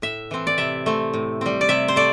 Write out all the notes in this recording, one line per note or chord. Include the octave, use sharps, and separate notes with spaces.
A2 E5
E3 C4
D5
C3 E5
A3 C4
A2
G3 C4
D5
C3 E5
C5
A3 D5